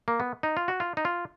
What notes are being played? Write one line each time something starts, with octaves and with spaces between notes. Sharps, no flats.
A#3
B3
D#4
F4
F#4
F4
D#4
F4